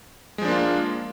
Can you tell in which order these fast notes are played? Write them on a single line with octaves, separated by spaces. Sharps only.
G#3 F3 D4 A#3 F4